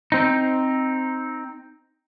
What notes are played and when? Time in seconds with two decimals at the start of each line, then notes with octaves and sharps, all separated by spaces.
0.12 C4 D#4